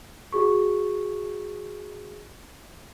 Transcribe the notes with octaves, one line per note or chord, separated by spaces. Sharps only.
F#4 G#4 C#6